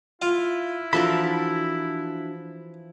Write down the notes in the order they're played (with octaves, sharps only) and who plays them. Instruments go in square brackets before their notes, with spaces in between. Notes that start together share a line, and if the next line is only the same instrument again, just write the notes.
[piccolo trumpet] E4 [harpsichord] F4 F5
[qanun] E3 F3 A#4 [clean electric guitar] D4 F#4 B5 [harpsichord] A4